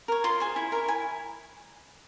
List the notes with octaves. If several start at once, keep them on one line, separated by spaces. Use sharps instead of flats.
A#4 C#5
F4 C6
G#4 C5
E4
A#4 C#5
E4 G#5